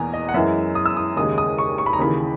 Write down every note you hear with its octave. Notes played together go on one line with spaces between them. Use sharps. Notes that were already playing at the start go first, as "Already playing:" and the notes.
Already playing: E2 B2 A#3 G#5 A#5
D#5
F#5
F#2 E3 G#3 E5
D#6
E6
D#6
D#2 C#3 G#3 D#6
D#6
C#6
C#6
B5
A#5
D#2 C#3 E3 B5